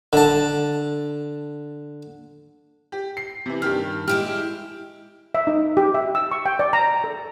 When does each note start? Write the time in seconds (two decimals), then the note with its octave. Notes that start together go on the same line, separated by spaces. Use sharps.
0.13 D3 A5
2.92 G4
3.17 C7
3.46 C3 E3
3.62 G2 D#3 G4 F6
4.08 G#3 E4 G4 G5 F6
5.35 E5
5.47 D#4
5.77 G4
5.94 E5
6.15 E6
6.31 C#6
6.46 G5
6.59 D5
6.73 A#5
7.04 A4